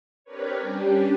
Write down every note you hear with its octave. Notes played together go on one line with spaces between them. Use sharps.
C4 D4 G4 A#4 B4 C#5
G3 C#4 D4 G4